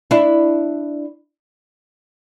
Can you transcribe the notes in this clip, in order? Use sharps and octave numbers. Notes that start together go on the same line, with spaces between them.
D4 E4